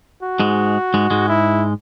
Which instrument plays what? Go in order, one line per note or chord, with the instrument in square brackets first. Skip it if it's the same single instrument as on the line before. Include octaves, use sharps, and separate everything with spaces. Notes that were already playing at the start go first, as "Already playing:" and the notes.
[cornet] F#4
[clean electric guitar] G#2 G#3
G#2 G#3
G#2 G#3
[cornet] E4